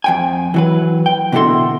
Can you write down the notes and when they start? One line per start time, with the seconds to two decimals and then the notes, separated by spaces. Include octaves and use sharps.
0.04 F2 G5 G#5
0.54 E3 F#3 B4
1.06 G5
1.32 B2 D3 E4 F#4 A4 C6